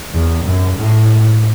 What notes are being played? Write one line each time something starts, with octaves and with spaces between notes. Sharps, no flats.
E2
F#2
A2